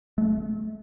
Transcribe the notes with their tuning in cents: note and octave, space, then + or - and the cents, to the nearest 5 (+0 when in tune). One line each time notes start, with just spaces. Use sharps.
A3 -35